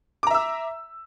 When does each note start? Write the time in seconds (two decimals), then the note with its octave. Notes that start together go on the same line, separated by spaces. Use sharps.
0.23 D6
0.27 A#5
0.31 E5
0.34 E6